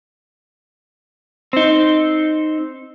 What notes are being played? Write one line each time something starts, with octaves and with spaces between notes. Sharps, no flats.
C4 D#4